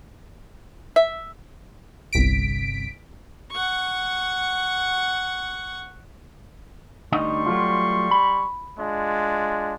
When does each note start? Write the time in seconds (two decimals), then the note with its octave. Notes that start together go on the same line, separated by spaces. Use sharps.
0.96 E5
2.13 G1 C2 B6 D7
3.51 F#5 C#6
7.12 D2 G3 D#4 D#5 C6 C#6
7.46 F#3 A3 F4
8.11 B5
8.78 G#3 D4 F4